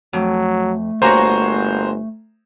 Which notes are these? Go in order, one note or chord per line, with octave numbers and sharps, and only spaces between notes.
F2 F#3 A3
G1 A#3 F#4 C5 C#5 G#5 A#5